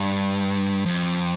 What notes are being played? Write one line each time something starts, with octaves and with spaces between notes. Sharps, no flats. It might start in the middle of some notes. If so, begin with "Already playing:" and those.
Already playing: G2
F2